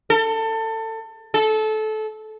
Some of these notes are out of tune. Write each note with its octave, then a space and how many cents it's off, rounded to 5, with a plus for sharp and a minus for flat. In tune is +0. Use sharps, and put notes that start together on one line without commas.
A4 +25
A4 -20